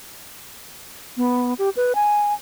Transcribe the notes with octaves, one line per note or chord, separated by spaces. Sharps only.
B3
G4
B4
G#5